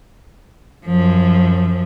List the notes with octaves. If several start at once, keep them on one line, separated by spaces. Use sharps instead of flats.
F#2 F3